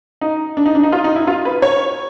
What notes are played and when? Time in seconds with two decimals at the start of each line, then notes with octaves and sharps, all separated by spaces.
0.21 D#4
0.57 D4
0.66 D#4
0.75 D4
0.83 D#4
0.92 F4
1.04 D#4
1.16 E4
1.27 F4
1.45 B4
1.62 C#5